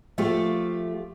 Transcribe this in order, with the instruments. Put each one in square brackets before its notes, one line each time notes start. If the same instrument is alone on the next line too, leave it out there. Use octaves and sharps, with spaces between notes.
[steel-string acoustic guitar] F3 A3 F4 G4